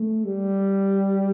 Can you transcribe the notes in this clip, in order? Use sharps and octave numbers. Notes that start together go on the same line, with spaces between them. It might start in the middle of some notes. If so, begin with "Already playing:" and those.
Already playing: A3
G3